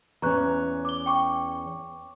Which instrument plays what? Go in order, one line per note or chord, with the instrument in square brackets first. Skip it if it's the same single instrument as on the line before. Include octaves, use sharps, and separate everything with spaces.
[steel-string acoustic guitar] E2 C#4 [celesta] A#5 C#6 F#6
[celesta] D6 G7
G5 C#6 D6